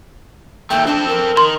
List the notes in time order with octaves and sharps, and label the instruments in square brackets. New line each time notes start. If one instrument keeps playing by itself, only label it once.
[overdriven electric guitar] D#2 A3 [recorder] G5
[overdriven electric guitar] C4 A4 [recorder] D4
[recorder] A#4
[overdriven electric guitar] D#3 [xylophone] C6